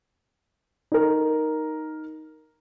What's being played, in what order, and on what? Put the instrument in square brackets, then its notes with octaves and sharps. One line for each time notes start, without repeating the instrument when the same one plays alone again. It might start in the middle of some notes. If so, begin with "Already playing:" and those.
[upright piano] D#4 A#4